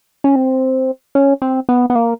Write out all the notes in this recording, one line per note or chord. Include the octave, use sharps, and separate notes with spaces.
C#4
C4
C#4
C4
B3
B3
A#3